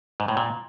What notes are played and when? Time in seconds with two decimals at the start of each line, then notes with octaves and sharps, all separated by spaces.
0.20 G#2
0.28 A2
0.37 A#2